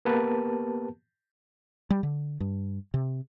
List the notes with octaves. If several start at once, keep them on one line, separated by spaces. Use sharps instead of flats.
A#3 B3 G4 A#4 B4 A5
G3
D3
G2
C3